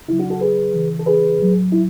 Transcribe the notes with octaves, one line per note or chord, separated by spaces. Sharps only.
C#3 F#3 E4
D4 F#4
F#4 A4
G#4 B4
C#3 E3
A4
G#4 B4
A2 F#3
E4